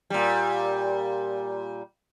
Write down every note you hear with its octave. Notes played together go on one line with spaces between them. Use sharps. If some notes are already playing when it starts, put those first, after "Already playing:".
A#2 G3